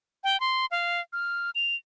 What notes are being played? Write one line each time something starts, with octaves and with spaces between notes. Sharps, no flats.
G5
C6
F5
F6
F7